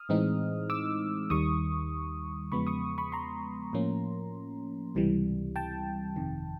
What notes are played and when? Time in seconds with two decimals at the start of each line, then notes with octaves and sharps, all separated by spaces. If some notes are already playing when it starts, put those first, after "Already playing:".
Already playing: D#6 F6
0.09 A2 E3 G#3 C4 D#4
0.70 D6 E6
1.30 D#2 D#3 G3 C#6 D#6
2.52 E2 C#3 F3 G#3 B3 B5 C#6
2.67 C#6 D#6
2.98 B5 C#6
3.12 A#5 C6
3.73 A2 F3 A#3 C#4
4.95 C#2 C3 E3 G3
5.56 G5 A5
6.16 G1 F2 C3 D#3